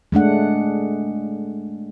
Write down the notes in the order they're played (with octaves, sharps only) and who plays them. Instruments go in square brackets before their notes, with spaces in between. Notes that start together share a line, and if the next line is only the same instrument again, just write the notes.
[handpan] G#3 A3 D4 F#5